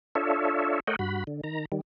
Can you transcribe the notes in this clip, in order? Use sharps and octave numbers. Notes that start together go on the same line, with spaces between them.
D4 F4 A4 C#5 E5
A3 A#4 C#5 D#5 F#5 G5
G2 F#4 B5
D3
D#3 A#5
D#3 G3